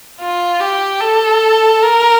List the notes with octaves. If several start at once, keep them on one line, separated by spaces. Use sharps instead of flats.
F4
G4
A4
A#4